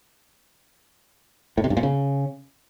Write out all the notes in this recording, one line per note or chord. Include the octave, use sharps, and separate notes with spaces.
A2
C3
G2
A#2
C#3